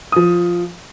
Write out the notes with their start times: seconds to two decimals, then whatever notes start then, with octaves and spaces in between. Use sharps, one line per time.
0.12 F3 D#6